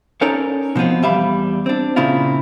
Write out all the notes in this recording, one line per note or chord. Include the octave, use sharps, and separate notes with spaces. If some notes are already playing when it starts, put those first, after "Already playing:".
C#4 D#4 A4 A#4 C#5 D5
B2 F3 A3 B3 C4
E2 G3 E5 F5 B5
C4 D4
A#2 C#3 C4 E4 F4